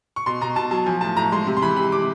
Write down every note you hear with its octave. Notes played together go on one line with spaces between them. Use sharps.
C#6
B2 C6
B2 A#5
B2 A5
F#3 A5
F3 G#5
A2 A5
A2 A#5
G#3 C6
C3
C6
E3 B5
C3 B5
C3 D6